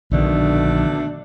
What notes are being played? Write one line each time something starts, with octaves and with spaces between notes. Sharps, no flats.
A#1 B2 D3 D#3 A3 D4